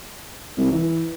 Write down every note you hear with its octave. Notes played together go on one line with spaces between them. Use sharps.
C2
E3